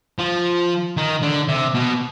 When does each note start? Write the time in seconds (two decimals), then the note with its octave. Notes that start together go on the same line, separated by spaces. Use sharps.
0.19 F3
0.97 D#3
1.22 D3
1.48 C3
1.75 B2